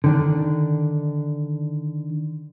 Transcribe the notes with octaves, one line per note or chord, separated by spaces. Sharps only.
D3 D#3 D4